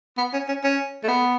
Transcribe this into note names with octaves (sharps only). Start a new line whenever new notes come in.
B3
C#4
C#4
C#4
A3
B3